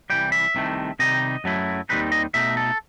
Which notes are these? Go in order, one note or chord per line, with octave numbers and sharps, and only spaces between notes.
C2 C3 E3 G3 G5
E5
C2 C3 D#3 A3
C3 D#3 G3 D#4 D#5
F#2 F#3 A3 E4
D#2 D#3 G3 C4 D#4 B4
D#5
B2 A3 D#4 E5
A4